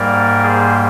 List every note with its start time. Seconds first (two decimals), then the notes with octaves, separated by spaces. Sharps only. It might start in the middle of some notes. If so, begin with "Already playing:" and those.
Already playing: G#2 G3 A#3 A#4 D5
0.43 G#4 C5